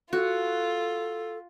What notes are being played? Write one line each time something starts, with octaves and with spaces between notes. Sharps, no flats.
F4 F#4 A4